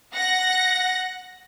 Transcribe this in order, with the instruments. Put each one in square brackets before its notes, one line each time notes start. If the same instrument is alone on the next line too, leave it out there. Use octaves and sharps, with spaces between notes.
[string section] F#5 A#6